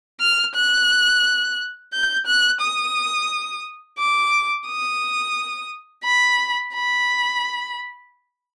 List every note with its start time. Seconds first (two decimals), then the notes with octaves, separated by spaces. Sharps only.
0.20 F6
0.55 F#6
1.93 G6
2.26 F#6
2.61 D#6
3.98 D6
4.67 D#6
6.04 B5
6.74 B5